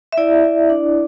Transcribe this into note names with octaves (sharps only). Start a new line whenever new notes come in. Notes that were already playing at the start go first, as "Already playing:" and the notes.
E5
E4 D5
E4
D4